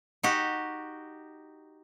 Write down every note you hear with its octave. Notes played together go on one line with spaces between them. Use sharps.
D#4 F#4 G4